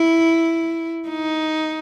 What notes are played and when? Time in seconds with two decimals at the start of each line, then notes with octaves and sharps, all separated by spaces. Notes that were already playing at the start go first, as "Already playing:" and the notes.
Already playing: E4
1.09 D#4